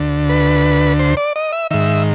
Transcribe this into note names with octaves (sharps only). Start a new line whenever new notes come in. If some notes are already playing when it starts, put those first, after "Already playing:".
Already playing: D2 D3
B4
C5
D5
D#5
E5
G#2 D#3 E5